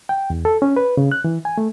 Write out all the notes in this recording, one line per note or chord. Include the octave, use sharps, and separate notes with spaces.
G5
E2
A4
C#4
B4
C#3
F#6
E3
G#5
A3